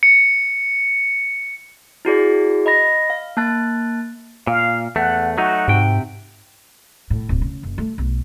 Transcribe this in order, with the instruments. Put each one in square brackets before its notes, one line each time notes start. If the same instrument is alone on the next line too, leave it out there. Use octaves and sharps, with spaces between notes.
[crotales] C#7
[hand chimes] E4 F#4 G#4 D5
D#5 B5 A#6
F5
A#3 A5 F#6 A6
[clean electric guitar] A#2 [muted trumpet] F5
[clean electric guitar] E2 A3 [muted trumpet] F#5
[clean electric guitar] F#3 A3 D#4 [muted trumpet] F#4
[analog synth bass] G#2 [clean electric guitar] C3 G5
[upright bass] A2
D1
C#3
F#1
A3
B1